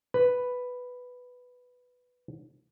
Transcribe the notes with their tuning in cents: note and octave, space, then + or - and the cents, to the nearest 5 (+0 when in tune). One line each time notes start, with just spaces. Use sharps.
B4 +5